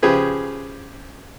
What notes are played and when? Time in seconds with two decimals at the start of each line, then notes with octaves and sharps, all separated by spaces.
0.03 C#3 F3 G4 G#4 B4